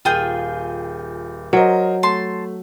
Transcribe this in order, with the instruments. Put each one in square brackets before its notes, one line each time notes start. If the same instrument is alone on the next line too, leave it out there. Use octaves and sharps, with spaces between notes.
[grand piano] D#1 G6 [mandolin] F4 G#4 G5
[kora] F#3 [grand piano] A#4 C5 D#5
[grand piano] A3 [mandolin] A5 C6